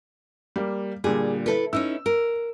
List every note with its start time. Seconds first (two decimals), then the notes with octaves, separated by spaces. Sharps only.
0.56 G3 A#3
1.04 A#2 D3 G3 G#4
1.46 E4 A4 B4
1.73 C#4 D#4 E4 E6
2.06 A#4